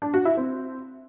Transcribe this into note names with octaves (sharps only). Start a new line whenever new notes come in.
D4
F#4
E4
C4